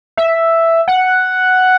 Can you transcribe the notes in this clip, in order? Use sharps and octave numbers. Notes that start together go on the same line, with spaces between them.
E5
F#5